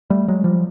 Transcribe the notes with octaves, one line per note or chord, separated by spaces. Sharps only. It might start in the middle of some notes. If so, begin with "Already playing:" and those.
G3 A3
F#3 G#3
F3 G3